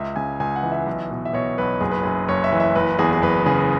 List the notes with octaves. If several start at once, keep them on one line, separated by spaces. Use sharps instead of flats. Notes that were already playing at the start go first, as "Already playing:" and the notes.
Already playing: C#2 E5
C#3 G#5
C#2 G#5
F#5
E3
E5
B1
B2
E5
B2 C#5
B1 B4
F#1 G#4
B4
F#2 G#4
F#1 C#5
E5
E3
E5
F#1 B4
E2 G#4
G#4
F#1 B4
C#3 G#4